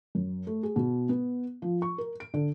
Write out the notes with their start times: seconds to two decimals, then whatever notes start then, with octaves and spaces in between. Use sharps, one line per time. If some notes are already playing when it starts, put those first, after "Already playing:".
0.15 F#2
0.47 A3
0.63 G#4
0.76 B2
1.09 B3
1.62 F3
1.82 C#6
1.98 A#4
2.20 D7
2.34 D3